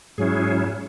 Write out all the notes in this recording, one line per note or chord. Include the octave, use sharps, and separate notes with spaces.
G#2 F#3 C#4 E4 G#4